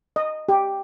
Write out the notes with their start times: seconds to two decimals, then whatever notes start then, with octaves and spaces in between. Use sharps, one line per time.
0.16 D#5
0.49 G4